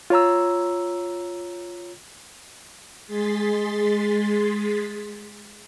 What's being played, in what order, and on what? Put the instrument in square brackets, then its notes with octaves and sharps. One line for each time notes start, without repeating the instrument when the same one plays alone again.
[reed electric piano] F4 C#5 A#5 E6
[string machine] G#3 G#4 C6 A6 B6